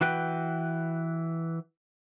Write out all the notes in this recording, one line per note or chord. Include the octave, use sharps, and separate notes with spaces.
E3 F#4 B4 G5